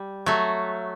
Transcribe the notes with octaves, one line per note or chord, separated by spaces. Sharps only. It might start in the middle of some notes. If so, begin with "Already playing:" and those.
Already playing: G3
F#3 A3